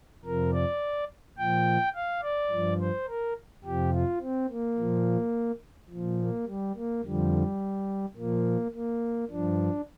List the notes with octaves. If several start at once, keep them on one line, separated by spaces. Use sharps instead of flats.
F2 C3 F3 A#4
D5
A#2 F3 G5
F5
D5
G2 F3
C5
A#4
F2 C3 F3 G4
F4
C4
A#3
A#2 F3
A#2 F3
A#3
G3
A#3
F2 D3 F3 G3
A#2 F3 A#3
A#3
G2 F3 D4